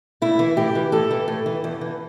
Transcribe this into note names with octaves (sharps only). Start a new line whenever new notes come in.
A2 E4
E3
A2 G4
E3
A2 A4
E3
A2
E3
E2
E3